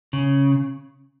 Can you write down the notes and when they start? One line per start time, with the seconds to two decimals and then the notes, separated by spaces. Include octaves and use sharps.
0.13 C#3